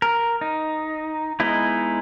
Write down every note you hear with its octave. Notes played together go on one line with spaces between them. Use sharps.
A#4
D#4
G#3 B3 D#4 E4